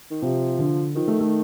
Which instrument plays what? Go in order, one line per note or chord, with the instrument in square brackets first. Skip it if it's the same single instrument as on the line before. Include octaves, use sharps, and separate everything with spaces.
[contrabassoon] D#3
[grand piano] C3 [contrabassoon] F3
[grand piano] D3
[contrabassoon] D#3 [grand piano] F3
[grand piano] A3
A3